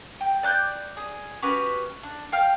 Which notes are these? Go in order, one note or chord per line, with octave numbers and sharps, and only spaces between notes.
G5
D5 F#6 G6
G#4
C#4 F#4 G4 B4
D4
F5 G5 F6